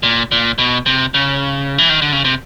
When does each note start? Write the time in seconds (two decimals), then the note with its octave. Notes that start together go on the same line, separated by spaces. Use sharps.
0.03 A#2
0.32 A#2
0.58 B2
0.86 C3
1.14 C#3
1.78 E3
1.89 D#3
2.02 D3
2.12 C#3
2.24 C3